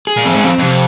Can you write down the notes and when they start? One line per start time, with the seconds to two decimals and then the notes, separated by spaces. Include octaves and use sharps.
0.07 G#4
0.17 A#2
0.25 F2 C4
0.34 G#2
0.44 F2 C4
0.59 F2 C3